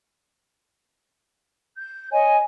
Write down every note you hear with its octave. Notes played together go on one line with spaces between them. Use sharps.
G6
C#5 D#5 G#5